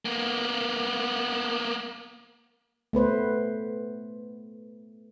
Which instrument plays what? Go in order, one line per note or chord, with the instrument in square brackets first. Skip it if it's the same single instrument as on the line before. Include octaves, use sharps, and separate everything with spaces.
[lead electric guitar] A#3 B3
[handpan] A3 B3 B4 C5